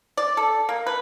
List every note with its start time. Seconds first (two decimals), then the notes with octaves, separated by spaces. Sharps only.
0.17 D5
0.37 A4
0.69 A#3
0.87 B4